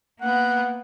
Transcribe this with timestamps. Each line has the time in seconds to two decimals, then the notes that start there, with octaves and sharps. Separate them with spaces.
0.21 A#3 B3 F#5